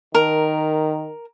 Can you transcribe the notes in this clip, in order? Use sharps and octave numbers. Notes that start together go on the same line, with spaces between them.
D#3 A#4